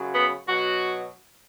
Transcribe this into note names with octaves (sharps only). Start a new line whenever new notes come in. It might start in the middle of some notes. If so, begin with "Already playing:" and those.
Already playing: F#2 C#3 F#3
B3
B2 F#3 F#4